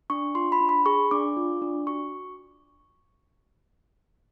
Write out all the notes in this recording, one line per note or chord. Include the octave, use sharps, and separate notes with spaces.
D4 C#6
F4 C6
B5
D4
B5
G#4 C#6
D4 D6
F4
D4
F#4 C#6